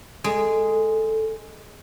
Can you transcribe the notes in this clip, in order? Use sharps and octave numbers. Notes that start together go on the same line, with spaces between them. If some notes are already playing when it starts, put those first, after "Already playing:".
G#3 A4